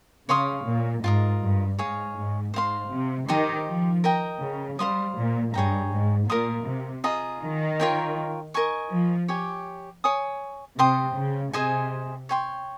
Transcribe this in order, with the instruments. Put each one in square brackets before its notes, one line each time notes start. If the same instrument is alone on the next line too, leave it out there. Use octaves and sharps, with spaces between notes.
[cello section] C#3 [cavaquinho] C#5 F5 C6 D#6
[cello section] A#2
[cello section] G#2 [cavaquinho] F4 A#4 D#5
[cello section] G2
[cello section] G#2 [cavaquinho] G#4 C#5 F5
[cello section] G#2
[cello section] G#2 [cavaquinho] C5 F5 C6
[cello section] C3
[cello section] D#3 [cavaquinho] D#4 G4 C5
[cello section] F3
[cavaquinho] A#4 D#5 G5 A#5
[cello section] C#3
[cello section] G3 [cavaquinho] C5 F5 C6 D#6
[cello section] A#2
[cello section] G2 [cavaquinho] G#4 C#5 G5 A#5
[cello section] G#2
[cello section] A#2 [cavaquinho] A#4 F5 C6 D#6
[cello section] C3
[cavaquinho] F4 G#4 D#5 A#5
[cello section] D#3
[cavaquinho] F4 A#4 C#5 G5
A#4 D#5 G#5 C#6
[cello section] F3
[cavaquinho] G4 C#5 G#5
C#5 G#5 D#6
[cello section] C3 [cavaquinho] C5 G5 C6 D#6
[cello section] C#3
[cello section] C3 [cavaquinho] G#4 C5 D#5 G#5
[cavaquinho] C#5 G5 C6